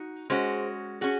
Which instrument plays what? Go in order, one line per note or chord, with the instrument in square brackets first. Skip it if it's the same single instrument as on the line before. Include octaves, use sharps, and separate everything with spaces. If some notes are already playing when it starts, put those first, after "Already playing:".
Already playing: [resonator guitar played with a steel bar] D#4 F#4
[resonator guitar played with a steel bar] G#3 C#4 F#4 [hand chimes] G#4 C5
[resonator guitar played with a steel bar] C#4 F#4 [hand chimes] G#4